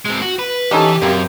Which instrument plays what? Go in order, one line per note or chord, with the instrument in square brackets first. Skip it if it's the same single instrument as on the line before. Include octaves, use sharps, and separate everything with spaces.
[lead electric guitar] G#3 C4
F#4
B4
[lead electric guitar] E3 [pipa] C#4 D#4 A4 [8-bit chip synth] G4
[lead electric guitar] F#2 [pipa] A#3 C4 C5